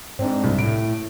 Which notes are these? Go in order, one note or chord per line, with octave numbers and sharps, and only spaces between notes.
G#2 C4 D4
C2
A2 D7